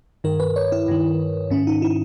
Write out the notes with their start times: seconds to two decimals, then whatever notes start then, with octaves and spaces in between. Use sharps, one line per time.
0.24 G2 D#3 A#4
0.40 B4
0.56 C#5
0.72 E4
0.88 G2 D#3
1.50 G#2 D#3 C#4
1.67 D#4
1.82 E4